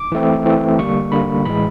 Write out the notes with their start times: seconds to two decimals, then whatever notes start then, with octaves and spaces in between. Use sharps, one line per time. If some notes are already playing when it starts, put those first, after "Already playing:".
Already playing: D6
0.12 E3 A3 C4
0.45 E3 A3 C4
0.79 D3 G3 A#3 C#6
1.12 D3 G3 A#3 B5
1.45 A2 E3 G#3 B5